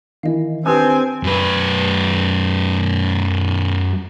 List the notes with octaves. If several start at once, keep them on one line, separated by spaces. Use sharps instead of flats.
D#3 E3 E4 D#5 F5
D#3 C4 D4 G4 B4 G#5 A5 D#6
F#2 B4